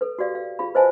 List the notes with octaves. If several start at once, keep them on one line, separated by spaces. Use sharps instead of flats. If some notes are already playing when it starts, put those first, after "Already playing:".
A4 B4
F#4 G4 D5 F5
F5
F4 G#4 F5 B5
B4 C5 D#5 F5 G#5 A5